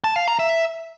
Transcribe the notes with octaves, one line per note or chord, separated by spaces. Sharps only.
A5
F5
A#5
E5